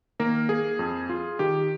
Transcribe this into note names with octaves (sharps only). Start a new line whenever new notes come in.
D#3 A#3 A#4
A#3 G#4
F2
F4
D#3 G4